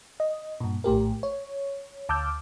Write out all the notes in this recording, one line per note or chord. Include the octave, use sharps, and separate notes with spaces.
D#5
G2 A#2
A#1 A2 G4 A#4
C#5
D2 A5 D6 E6 F6 G6